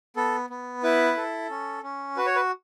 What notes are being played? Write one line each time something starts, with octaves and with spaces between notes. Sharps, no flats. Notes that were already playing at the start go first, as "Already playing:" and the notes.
B3 A4
B3
E4 B4
A4
C#4
C#4
F#4 B4
C#5
B4